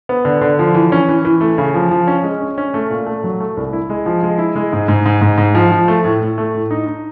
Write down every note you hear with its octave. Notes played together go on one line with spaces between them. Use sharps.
B3
D3
D3
F3
E3
C#4
E3
E3
A3
C#3
F3
F3
C#4
G#3
C#4
C#4
A3
A#2
A3
F#3
A3
C2
E4
G#3
F3
G#3
E4
G#3
G#2
G#2
G#2
G#2
G#2
F3
F3
A3
A2
A2
A3
A2
D#4
D#4